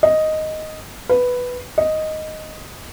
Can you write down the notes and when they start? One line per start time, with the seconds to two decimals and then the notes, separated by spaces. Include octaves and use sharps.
0.03 D#5
1.09 B4
1.78 D#5